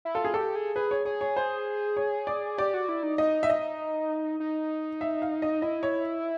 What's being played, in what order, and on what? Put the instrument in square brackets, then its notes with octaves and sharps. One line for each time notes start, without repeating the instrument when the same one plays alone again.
[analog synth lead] E4
[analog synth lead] F4 [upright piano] A4
[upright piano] G#4
[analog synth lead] G4 [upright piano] A4
[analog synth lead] G#4
[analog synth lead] G#4 [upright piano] B4
[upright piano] C#5
[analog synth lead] G#4 [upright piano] C#5
[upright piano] C#5
C5
C#5
D5
[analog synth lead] G4 [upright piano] D5
[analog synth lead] F#4
E4
D#4
[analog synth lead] D#4 [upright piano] D#5
[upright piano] E5
D#5
[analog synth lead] D#4
[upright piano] E5
F5
D#5
[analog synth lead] E4 [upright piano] D#5
[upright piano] C#5